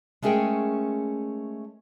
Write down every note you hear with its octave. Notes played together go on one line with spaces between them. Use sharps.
G#3 A3 C#4 G#4 A#4 G5